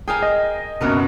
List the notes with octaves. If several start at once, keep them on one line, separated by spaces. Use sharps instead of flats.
G#4 A#4 F5 G5 G#5
D#5
F#1 F#2 B2 F#4 A#4 B4